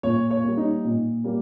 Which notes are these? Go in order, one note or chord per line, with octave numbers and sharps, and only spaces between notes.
A#2 C#5
C#5
G3 A#3
D#4
A#2
G3 A#3